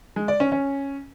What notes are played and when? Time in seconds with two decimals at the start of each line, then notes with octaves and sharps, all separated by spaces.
0.16 G#3
0.28 D5
0.40 C#4
0.52 C#4